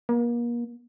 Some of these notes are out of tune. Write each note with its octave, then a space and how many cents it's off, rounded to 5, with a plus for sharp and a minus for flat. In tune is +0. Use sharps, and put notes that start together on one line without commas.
A#3 +35